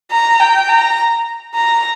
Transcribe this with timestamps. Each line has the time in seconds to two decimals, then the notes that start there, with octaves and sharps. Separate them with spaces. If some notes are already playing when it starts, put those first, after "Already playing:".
0.11 A#5
0.40 G5
0.69 A#5
1.55 A#5